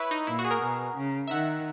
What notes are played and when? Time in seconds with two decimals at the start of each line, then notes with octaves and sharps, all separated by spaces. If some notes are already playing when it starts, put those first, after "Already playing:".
Already playing: E4 B4 C#5
0.11 D#4
0.27 A#2 E4
0.39 F#4
0.45 G#4
0.51 A#4
0.62 B2
0.97 C#3
1.28 E5
1.31 D#3 F#5